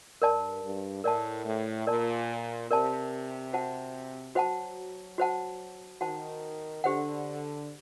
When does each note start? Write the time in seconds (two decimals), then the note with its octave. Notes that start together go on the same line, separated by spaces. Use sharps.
0.21 G2 A#4 D5 A5
0.62 G2
1.04 A2 A#4 D5 A5
1.45 A2
1.87 A#2 A#4 D5 A5
2.70 C3 A#4 D5 A5
3.53 F#4 C5 F#5 A5
4.35 F#3 F#4 C5 F#5 A5
5.18 F#4 C5 F#5 A5
6.01 D#3 F#4 C5 F#5 A5
6.84 D3 G4 C5 F#5